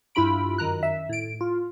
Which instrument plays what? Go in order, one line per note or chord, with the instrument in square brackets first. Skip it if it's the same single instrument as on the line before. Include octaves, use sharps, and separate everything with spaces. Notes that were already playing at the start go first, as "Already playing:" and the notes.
[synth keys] G2 E4 F4 B5 D7
F#2 D#3 A#5 F#6
E5
A2 D7
F4